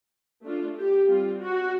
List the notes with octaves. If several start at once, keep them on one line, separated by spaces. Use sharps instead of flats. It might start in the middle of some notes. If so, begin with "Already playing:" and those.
A3 D4 F4
G4
G3 C4 F4
F#4